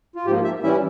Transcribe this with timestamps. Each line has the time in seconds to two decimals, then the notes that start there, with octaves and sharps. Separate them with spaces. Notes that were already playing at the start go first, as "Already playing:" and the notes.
0.16 F4
0.25 G#2 F3 A#3 G4
0.44 E5
0.63 E3 G3 C#4 E4 E5